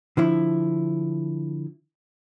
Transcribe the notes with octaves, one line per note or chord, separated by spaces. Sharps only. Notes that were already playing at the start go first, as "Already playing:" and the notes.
D3 F3 E4